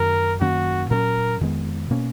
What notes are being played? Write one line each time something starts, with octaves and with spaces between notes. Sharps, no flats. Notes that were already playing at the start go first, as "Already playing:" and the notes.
Already playing: F#2 D#3 A#3 A#4
F#2 D#3 A#3 C#4 F#4
A#2 F#3 C#4 A#4
F2 D#3 G#3 B3
B2 A#3 C#4